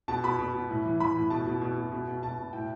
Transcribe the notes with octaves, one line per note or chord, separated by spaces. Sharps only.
B2 A5
B2 B5
B2
B2
A2
E3
E3 B5
A2
B2 A5
B2
B2
B2
B2
B2
B2 A5
B2
A2 G5